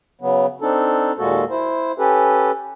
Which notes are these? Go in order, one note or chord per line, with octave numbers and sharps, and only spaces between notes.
C#3 F#3 B3
C4 D4 D#4 A4
D#2 A#2 G#3 A#3 F#4 A4
E4 C5
C#4 G4 A4 B4